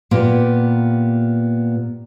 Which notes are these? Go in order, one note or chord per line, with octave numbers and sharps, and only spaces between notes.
A#2 B3 G4